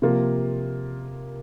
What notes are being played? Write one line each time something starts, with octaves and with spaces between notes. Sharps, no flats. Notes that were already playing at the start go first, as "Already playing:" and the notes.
C3 F3 A#3 F4